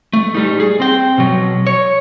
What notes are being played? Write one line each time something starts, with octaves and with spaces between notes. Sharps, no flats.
A3
G3 D#4
G#4
C4 G5
B2 F#3
C#5